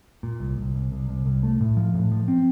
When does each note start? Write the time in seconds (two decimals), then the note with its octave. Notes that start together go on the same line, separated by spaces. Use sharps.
0.23 A#2
0.40 C2
0.58 C2
0.75 C2
0.92 C2
1.09 C2
1.26 C2
1.43 A3
1.60 A2
1.77 F3
1.94 A2
2.11 F3
2.28 C4